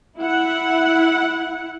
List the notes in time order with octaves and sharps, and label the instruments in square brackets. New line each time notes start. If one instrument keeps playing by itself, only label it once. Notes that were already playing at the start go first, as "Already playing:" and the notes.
[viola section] E4 F#5